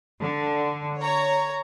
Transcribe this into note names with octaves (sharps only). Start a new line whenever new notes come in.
D3
C#5 A#5